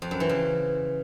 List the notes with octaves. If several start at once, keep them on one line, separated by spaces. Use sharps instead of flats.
F2
F#2
E3
C#3